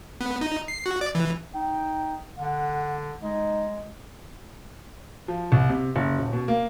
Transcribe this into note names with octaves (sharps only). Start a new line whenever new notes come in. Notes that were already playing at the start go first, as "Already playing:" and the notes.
B3
D#4
C7
F#4
D5
E3
D#4 G5
D3 F#5
G#3 D#4
F3
C2
C3
F#1
D#1
B2
A#3